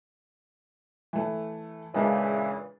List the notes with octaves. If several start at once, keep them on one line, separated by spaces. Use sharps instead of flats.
E3 A3
A#2 C#3 E3 G#3 D4